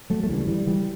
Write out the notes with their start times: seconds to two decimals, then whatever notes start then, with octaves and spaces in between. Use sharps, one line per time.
0.10 F#3 A3
0.23 A3
0.29 D2 C#3 E3 G3
0.47 E3 G3
0.67 E3 G3